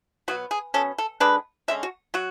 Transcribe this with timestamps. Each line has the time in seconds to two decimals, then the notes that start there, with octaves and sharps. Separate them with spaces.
0.28 B2 F#3 B3 F#4
0.51 G#4
0.74 B2 G#3 C#4 A4
0.98 A4
1.20 D3 G#3 D4 B4
1.68 D3 G#3 C#4 E5
1.83 F#4
2.14 F#3 F#4